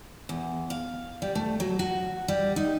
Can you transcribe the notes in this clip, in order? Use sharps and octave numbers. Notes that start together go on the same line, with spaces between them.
E2
F5
G3
A3
F#3
F#4
G3
D#4